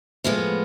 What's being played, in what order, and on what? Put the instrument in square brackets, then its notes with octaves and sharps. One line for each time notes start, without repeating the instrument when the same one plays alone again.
[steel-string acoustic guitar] A2 F3 G#3 B3